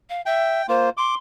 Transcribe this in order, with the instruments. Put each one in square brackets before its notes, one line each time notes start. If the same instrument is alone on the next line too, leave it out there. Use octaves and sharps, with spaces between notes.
[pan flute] F5
[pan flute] E5 [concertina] G5
[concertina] A#3 F4 [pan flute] C5
[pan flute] C6 [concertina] D6